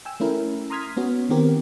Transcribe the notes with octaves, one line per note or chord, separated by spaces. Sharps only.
G5 G#5 E6
A3 C#4 E4 A#4
A#5 C6 D#6 F6 G#6 B6
B3 C#4 F#4
D#3 B3 C4 G4 A#4